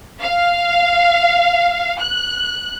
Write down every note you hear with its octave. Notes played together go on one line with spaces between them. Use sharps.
F5
F#6